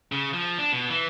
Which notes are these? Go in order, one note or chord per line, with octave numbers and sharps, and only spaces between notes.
C#3
F3
D4
B2
E3